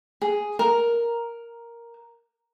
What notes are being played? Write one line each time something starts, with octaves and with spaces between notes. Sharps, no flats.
G#4
A#4